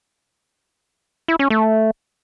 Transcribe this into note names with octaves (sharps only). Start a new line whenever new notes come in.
E4
C#4
A3